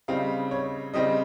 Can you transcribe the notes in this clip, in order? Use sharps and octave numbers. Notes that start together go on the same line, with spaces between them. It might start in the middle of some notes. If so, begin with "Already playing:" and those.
C#3 G3 C4 D#4 F5
C#5
C#3 G3 C4 D#4 D#5